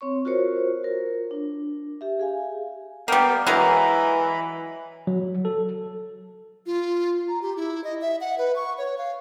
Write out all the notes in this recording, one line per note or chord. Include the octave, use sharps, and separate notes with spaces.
C4 C#5 C#6
F4 F#4 A#4 C5 C#5
F4 A#4
D4
G4 E5
G#4 F5 G#5
G3 A#3 B3 F5 G5
E3 F#3 G#3 A#4 A#5 B5
F#3
A4
F4
A#5
G4
E4
D#5
E5
F#5
B4
C#6
C#5
F5